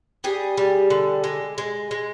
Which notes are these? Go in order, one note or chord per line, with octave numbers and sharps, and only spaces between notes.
G3 G#4
G3
D3
G#3
G#3
G#3